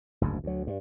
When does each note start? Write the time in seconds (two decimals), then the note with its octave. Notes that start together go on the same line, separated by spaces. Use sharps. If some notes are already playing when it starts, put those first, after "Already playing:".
0.21 F#1 D2 G#2
0.44 D2 F#3
0.67 G2